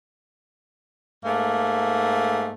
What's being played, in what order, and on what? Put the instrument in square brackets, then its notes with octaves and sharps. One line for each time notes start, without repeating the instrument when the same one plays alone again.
[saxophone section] G#2 A3 A#3